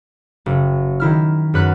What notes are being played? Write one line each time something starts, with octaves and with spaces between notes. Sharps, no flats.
F#1
D#3 E4 F6
F#2 B4 F#6